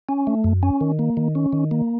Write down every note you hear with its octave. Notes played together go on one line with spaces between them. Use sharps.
C#4
A3
F#2
C#4
D#3
A#3
D#3
C#4
D#3
A#3